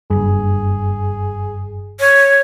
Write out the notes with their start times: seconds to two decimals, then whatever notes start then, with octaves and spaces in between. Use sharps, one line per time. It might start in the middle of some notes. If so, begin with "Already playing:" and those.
0.10 F#1 G2 G#4
2.00 C#5